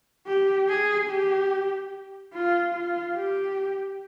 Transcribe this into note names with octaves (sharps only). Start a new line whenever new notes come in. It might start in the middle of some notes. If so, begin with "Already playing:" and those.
G4
G#4
G4
F4
F4
G4